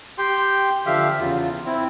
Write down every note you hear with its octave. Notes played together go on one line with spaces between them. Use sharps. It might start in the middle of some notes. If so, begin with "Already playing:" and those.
G4 G5 C6
D3 F3 G4 E5 F5
E2 C#3 F4
C4 E4